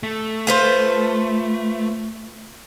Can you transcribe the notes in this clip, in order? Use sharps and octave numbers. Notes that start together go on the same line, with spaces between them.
A3
F4 B4 C5